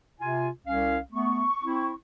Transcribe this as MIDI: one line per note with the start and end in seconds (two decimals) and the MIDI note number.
0.20 0.49 48
0.20 0.49 65
0.20 0.49 80
0.66 0.99 36
0.66 0.99 61
0.66 0.99 77
1.12 1.43 57
1.12 1.43 59
1.12 1.92 85
1.64 1.93 60
1.64 1.93 64